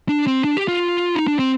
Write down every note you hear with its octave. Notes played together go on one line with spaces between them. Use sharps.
D4
C4
D4
G4
F4
D#4
D4
C4